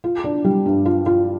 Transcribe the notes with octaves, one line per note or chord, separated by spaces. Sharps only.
F4
D4
G3
G2
F4
F4